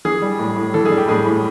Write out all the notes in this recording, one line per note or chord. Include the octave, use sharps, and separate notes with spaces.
E3 G#4
G3
A2
A2
E3 A4
G#4
G3
G4
A2 G#4
A2